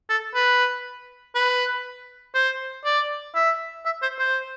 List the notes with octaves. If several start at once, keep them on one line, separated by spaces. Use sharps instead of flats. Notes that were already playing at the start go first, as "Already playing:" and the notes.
A4
B4
B4
C5
D5
E5
E5
C5
C5